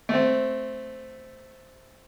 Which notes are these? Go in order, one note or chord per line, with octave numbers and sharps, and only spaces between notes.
A3 C4